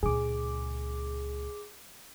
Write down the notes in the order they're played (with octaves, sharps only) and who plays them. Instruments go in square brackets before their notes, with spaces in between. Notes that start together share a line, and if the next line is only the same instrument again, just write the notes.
[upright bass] C#2 A#2 [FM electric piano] G#4 D6